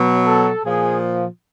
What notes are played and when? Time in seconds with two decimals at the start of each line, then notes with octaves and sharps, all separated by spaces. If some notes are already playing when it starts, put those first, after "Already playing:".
Already playing: B2 F#3
0.26 A4
0.65 A#2 F3 G#4